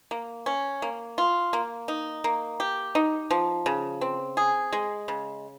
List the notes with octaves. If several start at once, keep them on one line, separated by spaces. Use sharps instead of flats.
A#3
C#4
A#3
F4
A#3
D#4
A#3
G4
D#4
F3
C#3
C4
G#4
G#3
C#3